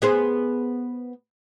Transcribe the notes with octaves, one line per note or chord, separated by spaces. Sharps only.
B3 G#4 C5